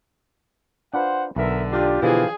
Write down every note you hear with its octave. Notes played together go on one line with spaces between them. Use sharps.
D4 F4 B4 C5 F#5
B1 D3 B3 A#4 E5
D4 F4 G4
B2 D3 E3 F3 G#4